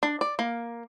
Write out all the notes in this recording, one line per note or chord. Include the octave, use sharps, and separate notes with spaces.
D4
D5
A#3